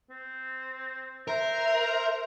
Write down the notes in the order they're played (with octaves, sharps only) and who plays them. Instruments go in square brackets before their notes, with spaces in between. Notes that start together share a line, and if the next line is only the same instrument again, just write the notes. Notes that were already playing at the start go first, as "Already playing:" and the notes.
[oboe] C4
[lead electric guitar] A#4 [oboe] C5 [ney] E5